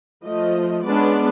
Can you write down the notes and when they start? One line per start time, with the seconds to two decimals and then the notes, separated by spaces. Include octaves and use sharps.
0.24 F3 A3 D#5
0.85 G#3 B3 C#4 D4 B4 D5